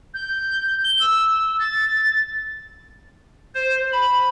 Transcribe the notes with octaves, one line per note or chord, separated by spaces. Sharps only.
G6
G7
E6
A6
C5
B5